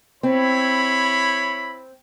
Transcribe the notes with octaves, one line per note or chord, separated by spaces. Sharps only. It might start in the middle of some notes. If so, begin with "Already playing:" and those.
C4 E4 C#5 B5